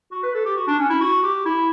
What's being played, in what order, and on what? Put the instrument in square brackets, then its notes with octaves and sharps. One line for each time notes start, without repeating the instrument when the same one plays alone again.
[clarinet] F#4
B4
A4
G4
F#4
D4
C#4
E4
F#4
G4
E4